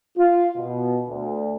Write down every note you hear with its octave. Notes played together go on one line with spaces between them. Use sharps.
F4
B2
D2